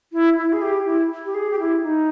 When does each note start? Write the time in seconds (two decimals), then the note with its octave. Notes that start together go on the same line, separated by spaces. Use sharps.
0.13 E4
0.38 E4
0.53 G#4
0.62 G4
0.86 E4
1.25 G4
1.34 G#4
1.50 G4
1.60 E4
1.83 D#4